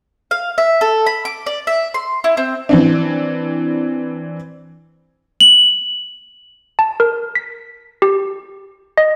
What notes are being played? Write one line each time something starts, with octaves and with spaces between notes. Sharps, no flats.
F5
E5
A4
B5
D6
D5
E5
C6
E4
C4
E3 C4 D4
F#7
A5
A#4
B6
G4
D#5